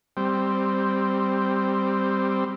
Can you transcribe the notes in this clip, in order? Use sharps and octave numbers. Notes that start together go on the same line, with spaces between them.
G3 C4